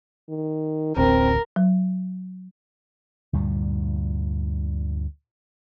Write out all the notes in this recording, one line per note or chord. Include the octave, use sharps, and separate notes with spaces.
D#3
D1 A1 D2 C4 A#4
F#3
D2 G2 A#2 G3